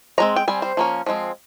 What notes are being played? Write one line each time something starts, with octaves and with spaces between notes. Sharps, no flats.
F3 G#3 C4 A#5
G5
G3 C4 G#5
C5
F3 A#3 C#4
F3 G#3 C4